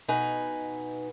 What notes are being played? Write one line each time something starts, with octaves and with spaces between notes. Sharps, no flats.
B2 D#4 B4 G#5